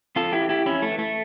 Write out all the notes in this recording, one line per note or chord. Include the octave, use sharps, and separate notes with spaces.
F2 F4 A4
E4 G4
E3
E4 G4
F2 C#4 E4
A3
E3
A3